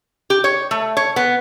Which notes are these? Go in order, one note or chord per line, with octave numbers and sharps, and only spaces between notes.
G4
C#5
A3
C#5
B3